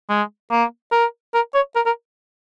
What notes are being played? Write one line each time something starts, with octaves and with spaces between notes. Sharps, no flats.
G#3
A#3
A#4
A#4
C#5
A#4
A#4